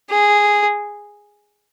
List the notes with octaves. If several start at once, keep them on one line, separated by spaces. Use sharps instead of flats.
G#4